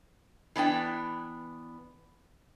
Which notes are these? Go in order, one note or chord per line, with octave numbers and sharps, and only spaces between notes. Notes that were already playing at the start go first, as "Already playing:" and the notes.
E3 B3 D4 G5